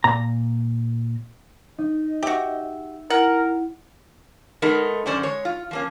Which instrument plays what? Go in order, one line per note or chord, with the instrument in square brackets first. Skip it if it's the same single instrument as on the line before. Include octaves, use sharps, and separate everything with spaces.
[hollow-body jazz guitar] A#2 A#5
[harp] D#4 [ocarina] D#5
[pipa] F#4 G4 [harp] E5 G6
[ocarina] E4 [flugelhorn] A#4 [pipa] F#5
[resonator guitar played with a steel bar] G#3 A3 B3 D#4 G#4 A#4
F#2 D3 C#4 C5 D5
G#3 C#5
F4
F3 A#3 C#4